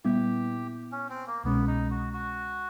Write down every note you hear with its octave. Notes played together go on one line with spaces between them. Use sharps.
A#2 G3 B3 E4 G4
C#4
C4
A#3
C2 B2 G#3 B3 C#4
D#4
F#4
F#4